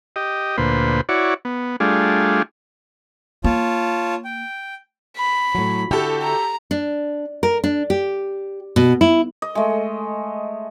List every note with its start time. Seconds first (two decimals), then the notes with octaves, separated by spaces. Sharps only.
0.16 G4 D#5
0.58 D2 A#2 B4 C5
1.09 E4 F#4 C#5 D5
1.45 B3
1.80 G3 A3 D4 F4 G#4
3.44 A#3 F4 C#5 A5
4.25 G5
5.17 B5
5.55 A2 F#3
5.91 D3 E4 F#4 G4 A4
6.22 A#5
6.71 D4
7.43 A#4
7.64 D4
7.90 G4
8.76 B2
9.01 E4
9.42 D#5
9.55 G#3 A3